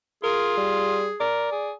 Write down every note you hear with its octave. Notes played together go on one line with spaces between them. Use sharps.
F4 G#4 A#4
G3
A#4 D5
G#4